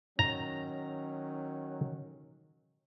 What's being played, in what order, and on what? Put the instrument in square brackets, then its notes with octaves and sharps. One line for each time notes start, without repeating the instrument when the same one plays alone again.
[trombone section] D#3 F#3 C#4 [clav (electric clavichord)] A#5